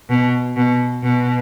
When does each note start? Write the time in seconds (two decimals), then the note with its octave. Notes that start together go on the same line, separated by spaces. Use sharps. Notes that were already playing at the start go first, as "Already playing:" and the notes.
0.09 B2
0.56 B2
1.03 B2